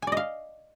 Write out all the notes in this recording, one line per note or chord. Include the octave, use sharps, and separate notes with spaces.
D5 D#5 F5 G#5